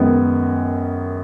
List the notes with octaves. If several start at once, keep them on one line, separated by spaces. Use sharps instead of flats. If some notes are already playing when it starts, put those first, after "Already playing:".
Already playing: F#2 D#3 G#3 B3